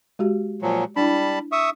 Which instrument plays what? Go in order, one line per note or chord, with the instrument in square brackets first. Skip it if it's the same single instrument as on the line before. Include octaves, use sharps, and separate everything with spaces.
[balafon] G#3 F#4 G4
[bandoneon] A#2 F3 F#3
[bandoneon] G3 A5 B5 [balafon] D4 E4
[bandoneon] E5 C#6 D#6